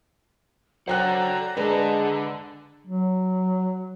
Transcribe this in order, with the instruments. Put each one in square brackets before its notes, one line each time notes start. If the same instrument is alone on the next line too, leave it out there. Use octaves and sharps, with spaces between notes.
[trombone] F#3 [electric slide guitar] A4 D5 F#5 [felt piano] C5 G5 F#6 [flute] A#5
[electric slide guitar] D3 G#5 A5 [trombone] G#3 [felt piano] D4 B4
[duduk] F#3